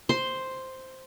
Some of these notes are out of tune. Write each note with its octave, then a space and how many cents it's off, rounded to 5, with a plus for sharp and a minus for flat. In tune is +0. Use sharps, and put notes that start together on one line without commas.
C5 +0 C6 +0